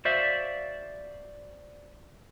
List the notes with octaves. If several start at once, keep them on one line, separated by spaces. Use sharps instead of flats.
F#4 C5 D5 E5 F5